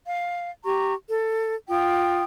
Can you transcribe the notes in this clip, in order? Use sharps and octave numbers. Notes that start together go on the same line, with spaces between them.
F5
G4 A#5 C#6
A4
F4 G5 D#6